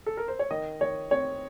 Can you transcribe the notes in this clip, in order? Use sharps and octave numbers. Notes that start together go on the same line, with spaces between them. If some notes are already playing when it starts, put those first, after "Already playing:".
A4
A#4
C5
C#5
D#3 D#5
D#3 C#5
C4 C#5